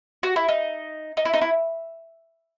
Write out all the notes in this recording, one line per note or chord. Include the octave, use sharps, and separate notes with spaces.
F#4
E4
D#4
D#4
E4
D#4
E4